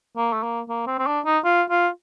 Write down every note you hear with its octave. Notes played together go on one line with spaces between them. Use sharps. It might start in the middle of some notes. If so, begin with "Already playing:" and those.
A#3
A3
A#3
A#3
C4
C4
D4
D#4
F4
F4